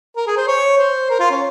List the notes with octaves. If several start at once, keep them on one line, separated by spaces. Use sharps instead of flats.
A#4
G#4
C5
C#5
C5
A#4
F4
C#4